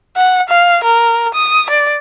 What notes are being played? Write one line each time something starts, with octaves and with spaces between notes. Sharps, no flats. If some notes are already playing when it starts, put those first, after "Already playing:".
F#5
F5
A#4
D#6
D5